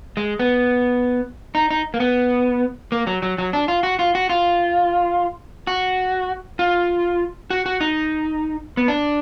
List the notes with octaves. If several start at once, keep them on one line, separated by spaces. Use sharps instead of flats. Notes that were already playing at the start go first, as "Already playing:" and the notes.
G#3
B3
D#4
D#4
A#3
B3
A#3
F#3
F#3
F#3
D4
F4
F#4
F4
F#4
F4
F#4
F4
F#4
F#4
D#4
B3
D4